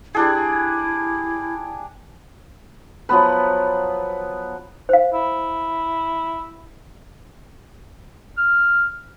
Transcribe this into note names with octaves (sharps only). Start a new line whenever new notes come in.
G3 D4 E4 G#4
F3 F#3 B3 B4
C5 F5
E4
F6